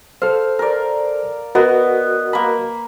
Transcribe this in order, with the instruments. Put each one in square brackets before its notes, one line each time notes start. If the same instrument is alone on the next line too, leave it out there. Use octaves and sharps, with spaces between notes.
[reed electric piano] A4 C5 [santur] F5
[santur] A#4 D5
[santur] B3 [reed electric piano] F#4 A#4 D#5
[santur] A#3 B5